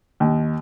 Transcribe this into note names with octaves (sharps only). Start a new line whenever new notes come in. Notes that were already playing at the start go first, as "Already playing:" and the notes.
D#2